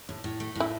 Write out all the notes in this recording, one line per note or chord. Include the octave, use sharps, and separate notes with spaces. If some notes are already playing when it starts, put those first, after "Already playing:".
A2
A2
A3
A2
E4